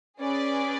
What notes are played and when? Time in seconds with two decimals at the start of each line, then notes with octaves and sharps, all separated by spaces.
0.19 C#4 G#4 B4 D5